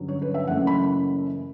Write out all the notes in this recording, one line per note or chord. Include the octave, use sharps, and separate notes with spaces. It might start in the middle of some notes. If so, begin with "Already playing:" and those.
Already playing: G2 D3 F#3 C#4
C#5
B4
E5
F#1 F#2 E3 A3 C#4 F#5
B5